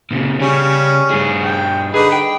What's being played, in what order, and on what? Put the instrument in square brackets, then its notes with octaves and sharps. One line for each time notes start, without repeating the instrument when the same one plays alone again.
[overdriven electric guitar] A#2 C#3
[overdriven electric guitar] C#3 [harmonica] G3 C#4
[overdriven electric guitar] G2 G#4
[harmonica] G5
[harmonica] D3 D#4 B4 [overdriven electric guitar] G#4
[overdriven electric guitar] G5